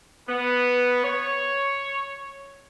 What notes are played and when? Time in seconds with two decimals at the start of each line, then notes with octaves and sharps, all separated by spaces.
0.29 B3
1.04 C#5